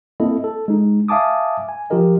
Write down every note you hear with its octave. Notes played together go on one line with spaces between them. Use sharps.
A#3 C4 E4 A4 D#5
A4
G#3 D#4
E5 F5 G#5 A5 D6 D#6
G#5
F3 F4 G4 A#4 D#5